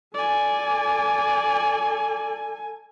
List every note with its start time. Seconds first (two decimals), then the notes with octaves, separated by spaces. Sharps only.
0.14 A4 D5 G#5